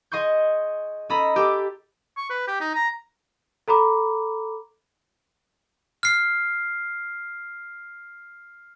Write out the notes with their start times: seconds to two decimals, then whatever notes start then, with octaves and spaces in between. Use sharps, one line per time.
0.12 G#4 D#5 C6 C#6 G6
1.09 C#4 A4 D#5 A#5 B5
1.36 G4 A4 D6
2.17 C#6
2.30 B4
2.48 G4
2.61 D#4
2.75 A#5
3.68 A4 A#5 B5 D6
6.03 F6 C7